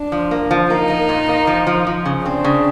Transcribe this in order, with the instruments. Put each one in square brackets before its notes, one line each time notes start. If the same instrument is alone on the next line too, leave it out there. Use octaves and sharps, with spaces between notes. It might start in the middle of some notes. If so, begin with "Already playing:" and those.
Already playing: [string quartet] D4
[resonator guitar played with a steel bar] F3
A#3
F3
[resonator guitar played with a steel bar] A#3 [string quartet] D#4
[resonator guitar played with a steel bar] A#3
A#2
A#3
F3
F3
F3
C#3
[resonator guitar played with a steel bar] C4 [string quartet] D4
[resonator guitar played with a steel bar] C#3